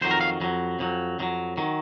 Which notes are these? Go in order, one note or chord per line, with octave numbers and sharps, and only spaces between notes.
F2 D#3 F#3 C5
A#4
F5
F2 D#3 F#3
F2 D#3 F#3
F2 D#3 F#3
D#3 F#3